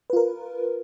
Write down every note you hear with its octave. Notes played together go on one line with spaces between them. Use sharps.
F4 A#4 B4